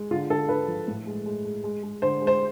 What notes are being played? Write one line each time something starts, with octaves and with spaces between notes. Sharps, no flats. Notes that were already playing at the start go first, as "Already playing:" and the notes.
Already playing: G#3
D3 F4
D3 A4
D3 B4
F3
A2
G#3
G#3
G#3
G#3
G#3
D3 C5
G#3
C5